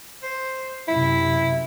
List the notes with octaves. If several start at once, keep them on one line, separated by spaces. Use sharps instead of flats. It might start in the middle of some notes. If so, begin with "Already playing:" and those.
C5
F#2 C3 E4